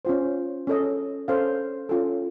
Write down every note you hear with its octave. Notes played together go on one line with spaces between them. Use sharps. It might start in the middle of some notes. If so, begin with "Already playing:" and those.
C#4 F4 C5
C#4 A4 D#5
C#4 A4 C5 F5
C#4 F4 A4